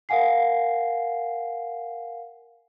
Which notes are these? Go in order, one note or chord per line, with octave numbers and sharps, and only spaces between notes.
A#4 F5 F#5 G#5 C7